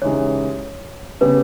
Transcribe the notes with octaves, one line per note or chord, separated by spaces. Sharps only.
C#3 E3 G#3 D#4 G4 C#5
C#3 G3 B3 G4 B4